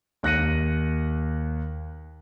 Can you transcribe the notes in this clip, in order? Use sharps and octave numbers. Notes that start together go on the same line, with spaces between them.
D#2 F#6 A#6 C#7 D#7